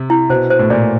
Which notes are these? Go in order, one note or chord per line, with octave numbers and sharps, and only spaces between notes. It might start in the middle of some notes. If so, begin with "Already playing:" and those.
Already playing: C3
E4
B2 C5
C5
A2
A#2 D5